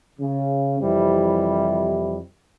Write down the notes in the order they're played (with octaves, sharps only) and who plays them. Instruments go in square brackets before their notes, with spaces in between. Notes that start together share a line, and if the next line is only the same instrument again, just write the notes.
[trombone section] C#3
F2 C3 E3 G3 E4